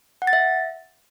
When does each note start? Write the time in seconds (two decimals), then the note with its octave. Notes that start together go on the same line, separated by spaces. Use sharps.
0.22 F#5
0.27 A6
0.33 E5